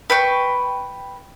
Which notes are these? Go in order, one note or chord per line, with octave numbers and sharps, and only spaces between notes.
B4 G5 C#6